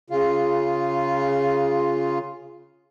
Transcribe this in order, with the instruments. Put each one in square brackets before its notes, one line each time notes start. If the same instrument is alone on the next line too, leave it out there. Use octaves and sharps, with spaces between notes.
[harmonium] C#3 F4